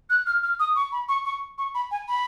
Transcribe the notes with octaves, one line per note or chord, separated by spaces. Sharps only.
F#6
F6
F6
D#6
C#6
B5
C#6
C#6
C#6
B5
G#5
B5